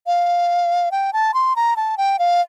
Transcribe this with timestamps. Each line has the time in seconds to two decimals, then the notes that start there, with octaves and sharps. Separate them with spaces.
0.07 F5
0.91 G5
1.13 A5
1.34 C6
1.56 A#5
1.76 A5
1.98 G5
2.19 F5